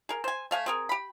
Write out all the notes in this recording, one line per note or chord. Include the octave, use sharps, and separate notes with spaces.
G#4 A#4
C5 G#5
A3 F5 G#5
C4 G#4 A#4
G4 B5